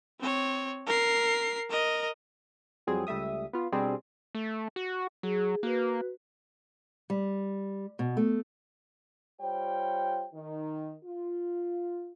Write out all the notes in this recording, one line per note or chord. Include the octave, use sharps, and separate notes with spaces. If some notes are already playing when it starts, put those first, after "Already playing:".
C4 C#5
A#4 C7
A#4 D#5
F2 F#3 G3 C4 G#4
C#2 G3 A3 E5 D#6
B3 F4
B2 G3 C4 D4 G#4
A3
F#4
F#3 G#4
A#3 F#4 B4
G3
B2
A3
G3 F4 C5 C#5 G5
D#3
F4